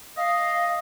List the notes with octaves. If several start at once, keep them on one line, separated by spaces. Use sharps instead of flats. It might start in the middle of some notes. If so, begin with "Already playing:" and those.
D#5 F5